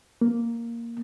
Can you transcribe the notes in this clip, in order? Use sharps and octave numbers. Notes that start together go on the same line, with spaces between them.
A#3